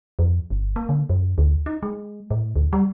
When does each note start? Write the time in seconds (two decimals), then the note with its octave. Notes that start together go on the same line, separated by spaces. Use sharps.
0.19 F2
0.50 G1
0.76 A#3
0.89 D3
1.09 F#2
1.38 D2
1.66 D#4
1.83 G#3
2.31 A2
2.56 D2
2.73 G3